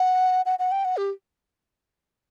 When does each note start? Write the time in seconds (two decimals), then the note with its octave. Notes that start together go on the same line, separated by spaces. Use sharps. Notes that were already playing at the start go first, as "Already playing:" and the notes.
Already playing: F#5
0.46 F#5
0.59 F#5
0.72 G5
0.85 F#5
0.97 G4